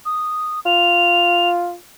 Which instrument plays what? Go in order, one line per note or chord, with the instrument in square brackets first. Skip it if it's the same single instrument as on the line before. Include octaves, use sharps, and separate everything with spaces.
[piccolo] D#6
[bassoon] F4 [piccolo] F7